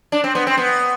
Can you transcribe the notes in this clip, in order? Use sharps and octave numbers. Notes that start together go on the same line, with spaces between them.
D4
C4
B3
C4
B3